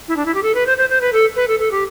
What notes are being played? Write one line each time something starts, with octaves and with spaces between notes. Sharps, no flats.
E4
D4
E4
G4
A4
B4
C5
C5
C5
B4
A4
B4
A4
A4
G4